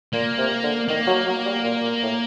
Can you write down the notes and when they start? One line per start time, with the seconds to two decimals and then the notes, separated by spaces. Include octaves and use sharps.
0.13 A#2 A#3
0.38 C3
0.63 D3
0.88 D#3 A#3
1.07 F#3
1.26 F#3
1.46 G3
1.64 A#2
1.82 A#2
2.02 A2